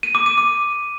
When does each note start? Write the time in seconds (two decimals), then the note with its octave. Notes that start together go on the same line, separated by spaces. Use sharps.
0.03 D#7
0.15 D6
0.26 D#7
0.38 D6